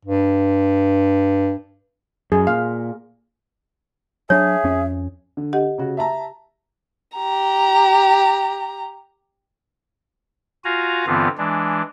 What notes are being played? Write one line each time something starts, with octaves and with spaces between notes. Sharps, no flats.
G2
F#2 G#4
A#2 F5
F#3 D4 G#4 C#5 E5
F2 C#4
D3
G4 D#5 F#5
C#3 F#4
E5 A5 A#5
G4 A#5
F4 F#4 F5 G#5 A#5
G2 D3 E3 B3 C4 F4
E3 G#3 D4